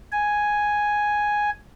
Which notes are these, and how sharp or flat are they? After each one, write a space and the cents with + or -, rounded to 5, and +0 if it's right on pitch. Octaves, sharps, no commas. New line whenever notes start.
G#5 +0